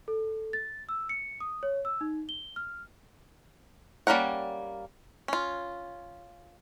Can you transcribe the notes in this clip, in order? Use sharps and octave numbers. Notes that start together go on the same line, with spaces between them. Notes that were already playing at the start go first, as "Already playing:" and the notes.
A4
A6
E6
C#7
D#6
C#5
E6
D#4
G7
F6
G3 A#3 C#4 A#4 F#5
C#4 F4